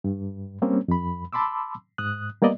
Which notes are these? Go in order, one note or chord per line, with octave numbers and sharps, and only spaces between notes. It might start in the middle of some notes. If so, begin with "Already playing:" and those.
G2
G3 A#3 C4 C#4
F2 B5
A5 B5 C6 D6 E6
G#2 D#6 F#6
G3 A#3 B3 D5 D#5